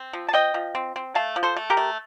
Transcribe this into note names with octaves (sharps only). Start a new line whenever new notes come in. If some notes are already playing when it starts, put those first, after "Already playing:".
Already playing: C4
F3
A5
C4 D#5 G5
F3
C4
C4
A3 F5 A5
F3
A4 C5
A3
G4 A#4
A3